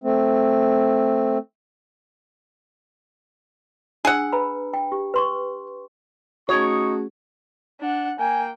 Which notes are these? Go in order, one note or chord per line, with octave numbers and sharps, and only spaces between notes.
A3 C4
D4 G#4 F#5 E6
B4 A#5 B5
G5
G4
B4 C6 C#6
A3 C#4 D#4 F#4 G#4 C#5 C#6 D#6
D4 F#5
A#3 G5 G#5